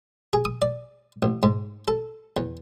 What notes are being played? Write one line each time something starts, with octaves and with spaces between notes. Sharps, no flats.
G#4
D#6
D5
A1
G#2
A4
E2